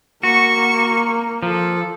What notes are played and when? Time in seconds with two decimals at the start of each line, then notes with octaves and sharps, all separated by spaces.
0.23 A#3 F#4 C#6
1.42 F3 A4